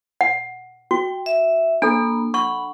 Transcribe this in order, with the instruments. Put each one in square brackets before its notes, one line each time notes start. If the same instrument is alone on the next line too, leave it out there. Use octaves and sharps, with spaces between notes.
[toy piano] F#5
[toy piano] F#4 [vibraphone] G5
[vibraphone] E5
[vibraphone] A#3 B5 [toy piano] D4 A4
[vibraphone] F#5 B5 [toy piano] C#6